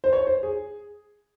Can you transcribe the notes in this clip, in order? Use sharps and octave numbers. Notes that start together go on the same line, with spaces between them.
C5
C#5
C5
G#4